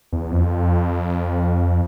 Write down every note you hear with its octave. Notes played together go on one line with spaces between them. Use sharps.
E2
F2